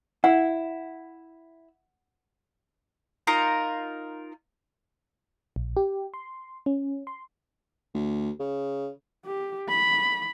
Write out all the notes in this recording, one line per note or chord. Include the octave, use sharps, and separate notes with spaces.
E4 F#5
D#4 F4 A#4 A#5
A#1
G4
C6
C#4
C6
D2
C#3
G4
B5